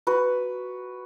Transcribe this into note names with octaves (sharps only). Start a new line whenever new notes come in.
F#4 B4